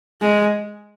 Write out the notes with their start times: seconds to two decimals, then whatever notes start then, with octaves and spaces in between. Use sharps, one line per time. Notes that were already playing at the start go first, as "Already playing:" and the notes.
0.21 G#3